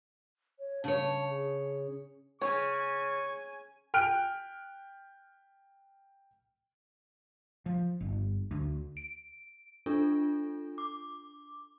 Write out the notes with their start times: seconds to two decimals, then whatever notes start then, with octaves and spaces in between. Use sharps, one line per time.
0.59 C#5
0.84 C#3 C#5 A5
1.30 G#4
2.42 C#3 C#5 G#5 C#6
3.94 G5 F6 F#6 D7
7.66 F3
8.01 G1
8.51 D2
8.97 D7
9.86 D4 F4 A4
10.78 D6